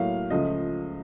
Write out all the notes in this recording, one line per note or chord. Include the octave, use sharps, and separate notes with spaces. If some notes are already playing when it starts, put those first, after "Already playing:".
Already playing: A2 F#3 A#3 F5
C#2 C#3 F3 A3 D#5